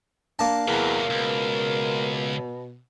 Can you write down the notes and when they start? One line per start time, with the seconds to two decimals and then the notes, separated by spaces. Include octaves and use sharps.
0.39 A#3 D4 A5
0.68 E2 C3 F#3 A#4
1.10 C#2 B2